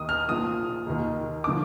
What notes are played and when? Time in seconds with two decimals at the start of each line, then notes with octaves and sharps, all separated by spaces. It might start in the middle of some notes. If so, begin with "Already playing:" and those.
Already playing: D#2 D#3 D#6
0.09 F6
0.29 A#1 A#2 F3 D#6
0.87 D#2 D#3
1.44 D6
1.47 D3 F3